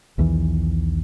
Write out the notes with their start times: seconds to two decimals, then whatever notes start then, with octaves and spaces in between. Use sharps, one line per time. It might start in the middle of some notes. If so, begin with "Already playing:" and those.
0.18 B1 E2 D#3 E3